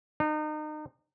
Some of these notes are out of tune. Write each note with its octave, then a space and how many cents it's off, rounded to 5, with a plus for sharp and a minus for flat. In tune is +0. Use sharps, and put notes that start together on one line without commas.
D#4 -30